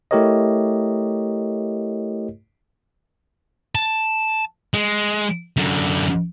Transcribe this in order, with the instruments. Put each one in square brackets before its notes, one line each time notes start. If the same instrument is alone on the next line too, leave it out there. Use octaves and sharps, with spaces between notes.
[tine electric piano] A3 E4 G4 A#4 C#5 D#5
[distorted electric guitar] A5
G#3
F#2 D3